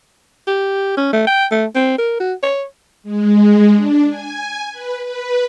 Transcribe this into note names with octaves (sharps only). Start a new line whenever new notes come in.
G4
C#4
A3
G5
A3
C4
A#4
F#4
C#5
G#3
D4
G#5
B4
B4